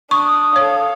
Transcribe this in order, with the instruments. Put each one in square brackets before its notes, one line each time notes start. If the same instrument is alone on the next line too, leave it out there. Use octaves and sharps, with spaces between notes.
[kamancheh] D4 [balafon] C#6 [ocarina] D#6
[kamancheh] A4 F5 [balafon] C#5